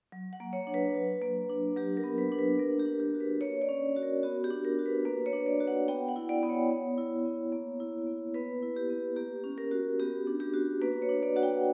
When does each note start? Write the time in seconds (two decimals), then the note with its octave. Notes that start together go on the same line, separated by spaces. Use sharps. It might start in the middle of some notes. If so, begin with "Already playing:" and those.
0.12 F#3
0.33 F#5
0.40 A#3
0.53 C#5
0.67 D4
0.74 B4
0.95 F#3
1.22 A#3
1.50 D4
1.76 F#3 G4
1.97 A#4
2.04 B3
2.18 B4
2.32 D4
2.39 B4
2.59 A#3 A#4
2.80 G4
2.86 D4
3.00 G4
3.14 F#4
3.20 B4
3.41 A#3 C#5
3.62 D5
3.69 C#4
3.97 F#4
4.03 A#4
4.23 B3 F#4
4.44 G4
4.50 D4
4.65 A#4
4.79 F#4
4.86 B4
5.05 A#3 B4
5.26 C#5
5.33 D4
5.46 D5
5.60 F#4
5.67 F#5
5.88 B3 G5
6.08 F#5
6.16 E4
6.29 D5
6.43 B3
6.49 C#5
6.70 B3
6.98 E4
7.25 B3
7.52 A#3
7.80 E4
8.07 A#3
8.34 B3 B4
8.63 E4
8.76 G4
8.90 B3
9.16 A#3 G4
9.44 C#4
9.58 A#4
9.71 F#4
10.00 B3 G4
10.27 D4
10.40 G4
10.54 F#4
10.82 A#3 B4
11.02 C#5
11.09 D4
11.23 D5
11.36 F#4 F#5
11.43 G5